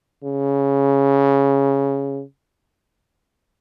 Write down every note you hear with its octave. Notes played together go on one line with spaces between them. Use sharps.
C#3